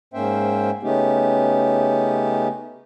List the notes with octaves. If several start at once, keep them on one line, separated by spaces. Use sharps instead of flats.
G#2 A#3 C#4 C5 E5 G5
C#3 A3 B3 C#4 D#4 G4